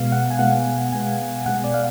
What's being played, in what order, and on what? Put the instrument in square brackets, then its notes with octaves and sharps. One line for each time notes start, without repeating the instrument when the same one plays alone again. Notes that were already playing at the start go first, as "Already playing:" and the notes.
Already playing: [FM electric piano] B2 G#3 B3 F5
F#5
G#5
B2 G#3 B3 F#5
B2 G#3 B3 G#5
B2 G#3 B3 F#5
D5
F5